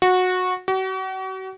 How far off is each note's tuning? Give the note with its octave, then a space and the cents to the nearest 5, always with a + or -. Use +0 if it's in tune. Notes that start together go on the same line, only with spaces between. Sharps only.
F#4 -15
F#4 +40